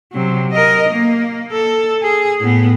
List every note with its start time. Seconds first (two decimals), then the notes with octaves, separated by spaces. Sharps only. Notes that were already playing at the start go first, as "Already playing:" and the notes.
0.12 C3 F#3
0.52 A#4 D#5
0.89 A#3
1.52 A4
2.02 G#4
2.40 A2 B3